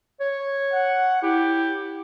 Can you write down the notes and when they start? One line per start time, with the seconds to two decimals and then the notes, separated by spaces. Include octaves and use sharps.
0.20 C#5
0.73 F#5
1.23 E4 G4